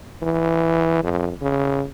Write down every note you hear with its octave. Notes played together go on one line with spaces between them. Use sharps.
E3
F2
C#3